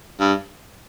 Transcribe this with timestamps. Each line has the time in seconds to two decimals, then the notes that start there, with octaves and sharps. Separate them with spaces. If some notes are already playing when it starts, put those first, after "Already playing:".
0.20 G2